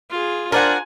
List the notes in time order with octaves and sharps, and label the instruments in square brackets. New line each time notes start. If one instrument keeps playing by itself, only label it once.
[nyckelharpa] F4 G#4
[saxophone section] D4 C5 [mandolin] F4 D5 F#5 [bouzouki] A#4 [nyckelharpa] G#5